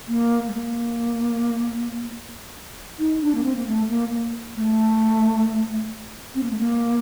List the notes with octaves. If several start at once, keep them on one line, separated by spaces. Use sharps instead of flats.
A#3
A3
A#3
D#4
D4
A#3
C4
A#3
A3
A#3
A#3
A3
C4
A#3
A3
A#3